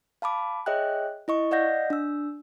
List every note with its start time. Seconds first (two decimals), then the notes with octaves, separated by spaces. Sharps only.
0.22 F5 A5 B5 D6
0.66 G#4 C#5 D#5 E5 G5 F#6
1.28 E4 D#5 C#6
1.51 D5 D#5 F5 F#5 G6 A#6
1.90 D4 E6